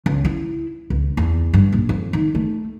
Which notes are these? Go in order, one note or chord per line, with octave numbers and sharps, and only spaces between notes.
C#2
E4
C#2
E2
G2
A#1
F2
D#3
A3